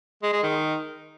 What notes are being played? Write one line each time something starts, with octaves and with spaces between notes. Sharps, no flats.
G#3
G#3
D#3